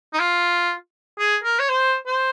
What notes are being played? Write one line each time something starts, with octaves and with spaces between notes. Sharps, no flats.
D#4
F4
G#4
A#4
C#5
C5
C5